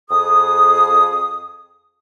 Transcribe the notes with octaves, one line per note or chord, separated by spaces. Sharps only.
F2 G#4 D#6